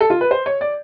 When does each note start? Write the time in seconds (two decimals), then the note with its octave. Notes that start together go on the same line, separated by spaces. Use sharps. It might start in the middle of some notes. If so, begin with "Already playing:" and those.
0.01 A4
0.10 F4
0.21 B4
0.31 C5
0.46 C#5
0.61 D5